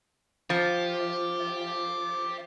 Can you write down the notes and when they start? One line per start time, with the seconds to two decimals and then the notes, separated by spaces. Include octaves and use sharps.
0.50 F3 G4